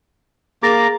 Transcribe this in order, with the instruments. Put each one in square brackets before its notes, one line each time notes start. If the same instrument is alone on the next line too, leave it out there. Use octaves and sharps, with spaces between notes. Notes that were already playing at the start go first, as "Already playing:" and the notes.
[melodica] A#3 A#5 D6 [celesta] G#4 A6 A#6